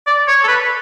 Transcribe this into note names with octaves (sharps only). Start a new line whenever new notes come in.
D5
C#5
A4
B4